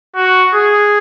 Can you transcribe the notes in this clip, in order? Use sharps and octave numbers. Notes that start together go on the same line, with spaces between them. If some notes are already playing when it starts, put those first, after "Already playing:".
F#4
G#4